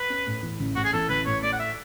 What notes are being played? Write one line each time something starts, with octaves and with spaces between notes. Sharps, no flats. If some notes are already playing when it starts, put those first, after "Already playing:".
Already playing: B4
C#4
A2
E3
A1
A2 F#4
G#4
E3 A4
A1 B4
A2 C#5
A3 D5
F#5
E5